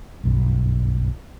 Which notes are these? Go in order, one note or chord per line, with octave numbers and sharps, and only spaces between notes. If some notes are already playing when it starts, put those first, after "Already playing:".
F#1 B1 G2